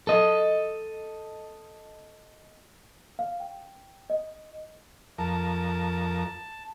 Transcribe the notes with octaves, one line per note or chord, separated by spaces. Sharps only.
A4 D#5
F5
G5
D#5
F2 A#4 A5